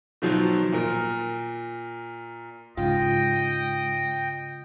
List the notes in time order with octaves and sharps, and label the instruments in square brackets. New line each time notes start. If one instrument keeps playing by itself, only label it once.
[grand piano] B2 D#3 F3 F#3
A#2 A#4
[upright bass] G#2 [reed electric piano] C#3 F4 [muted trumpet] D#5 [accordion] G5